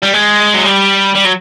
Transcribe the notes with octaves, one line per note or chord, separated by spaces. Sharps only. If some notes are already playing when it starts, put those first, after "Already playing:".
G3
G#3
F#3
G3
G3
F#3